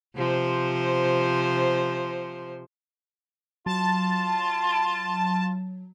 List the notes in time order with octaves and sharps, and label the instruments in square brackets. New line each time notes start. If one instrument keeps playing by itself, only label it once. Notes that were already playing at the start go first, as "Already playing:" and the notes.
[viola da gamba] C3 F3 C5
[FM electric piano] F#3 [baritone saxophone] F4 [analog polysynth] A5